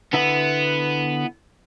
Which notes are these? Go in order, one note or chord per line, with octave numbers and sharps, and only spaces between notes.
D3 B3 E4 E5